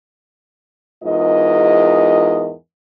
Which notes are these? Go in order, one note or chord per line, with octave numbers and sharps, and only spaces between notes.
E2 G#2 F4 A#4 D#5